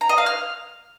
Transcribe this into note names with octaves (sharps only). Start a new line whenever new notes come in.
A#5
D#5
F5
F6